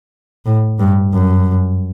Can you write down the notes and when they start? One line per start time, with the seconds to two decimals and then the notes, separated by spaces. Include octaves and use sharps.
0.46 A2
0.79 G2
1.13 F#2